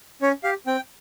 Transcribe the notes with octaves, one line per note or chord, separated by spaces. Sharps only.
C#4 C#5
G4 F5
C4 G5